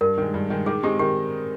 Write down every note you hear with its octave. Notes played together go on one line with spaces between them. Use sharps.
G2 A#4
D#3 G#3
G2
D#3 G#3
D#3 G#4
G#3 C4 D#4 G4
D#3 G4